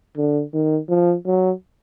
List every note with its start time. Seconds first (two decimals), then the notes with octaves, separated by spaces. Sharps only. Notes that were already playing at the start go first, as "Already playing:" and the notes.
0.17 D3
0.53 D#3
0.89 F3
1.26 F#3